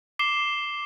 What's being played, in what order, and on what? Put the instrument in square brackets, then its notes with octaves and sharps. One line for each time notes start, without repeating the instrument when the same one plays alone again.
[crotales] D6 C7 E7 G7